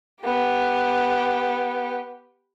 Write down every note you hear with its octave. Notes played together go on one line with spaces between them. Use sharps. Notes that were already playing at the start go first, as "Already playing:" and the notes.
B3 G4